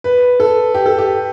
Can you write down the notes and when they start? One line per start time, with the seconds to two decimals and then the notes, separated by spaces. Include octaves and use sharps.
0.04 B4
0.40 A4
0.74 G4
0.86 A4
0.98 G4